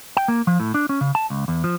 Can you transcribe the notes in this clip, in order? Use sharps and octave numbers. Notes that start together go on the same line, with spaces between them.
G5
A#3
F3
A2
D4
C#4
C#3
A5
C#2
E2
F3